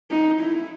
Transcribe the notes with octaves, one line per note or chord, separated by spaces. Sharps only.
D#4
E4